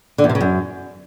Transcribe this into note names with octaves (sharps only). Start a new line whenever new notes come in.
D3
E2
C3
C#3
F#2